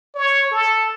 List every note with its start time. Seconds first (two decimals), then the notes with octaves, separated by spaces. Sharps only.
0.15 C#5
0.51 A4